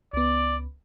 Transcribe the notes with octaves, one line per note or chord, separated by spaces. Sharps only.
C#2 B3 D5